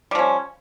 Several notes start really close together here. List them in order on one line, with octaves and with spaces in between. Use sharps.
G3 F3 C#4